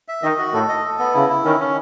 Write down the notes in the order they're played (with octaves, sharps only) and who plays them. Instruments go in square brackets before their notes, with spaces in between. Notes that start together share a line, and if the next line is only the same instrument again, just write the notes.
[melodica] E5
[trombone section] D#3 [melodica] D#5
[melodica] F#4
[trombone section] A2 [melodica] A4
[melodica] D#5
A4
B3
[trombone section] C#3 [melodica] E4
[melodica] E4
[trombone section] D#3 [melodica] C#4
[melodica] C#4